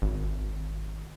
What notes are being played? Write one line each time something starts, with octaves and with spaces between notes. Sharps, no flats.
G#1